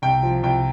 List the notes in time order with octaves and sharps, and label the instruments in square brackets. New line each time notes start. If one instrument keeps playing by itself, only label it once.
[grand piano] C2 G5
F3
C2 G5